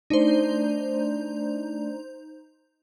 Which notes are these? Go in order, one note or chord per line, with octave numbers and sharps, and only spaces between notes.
A3 D4 D#4 C5 D5